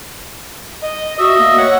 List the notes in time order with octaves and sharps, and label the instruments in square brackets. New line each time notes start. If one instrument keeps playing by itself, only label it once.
[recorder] D#5
[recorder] F#4 [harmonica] D#5 E5
[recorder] A#3
[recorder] C#5 [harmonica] F#5